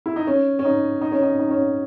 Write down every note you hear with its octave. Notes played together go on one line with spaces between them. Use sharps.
E4
D#4
C#4
C#4
D#4
D#4
C#4
D#4
D#4
C#4